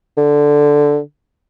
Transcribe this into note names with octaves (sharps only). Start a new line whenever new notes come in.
D3